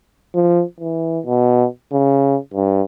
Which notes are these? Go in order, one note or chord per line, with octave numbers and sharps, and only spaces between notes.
F3
E3
B2
C#3
G2